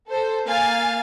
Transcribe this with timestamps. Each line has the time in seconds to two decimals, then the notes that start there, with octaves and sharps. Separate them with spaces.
0.10 A4 C5
0.46 A#3 F5 G#5 A6